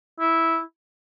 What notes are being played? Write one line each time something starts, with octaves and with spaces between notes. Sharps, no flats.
E4